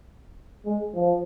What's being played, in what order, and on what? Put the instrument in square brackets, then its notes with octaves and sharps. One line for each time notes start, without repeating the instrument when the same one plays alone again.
[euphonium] G#3
F3